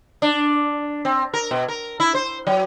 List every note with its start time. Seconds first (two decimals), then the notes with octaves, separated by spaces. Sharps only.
0.22 D4
1.05 C4
1.34 A#4
1.51 B2
1.68 A#4
2.00 E4
2.15 C5
2.47 F#3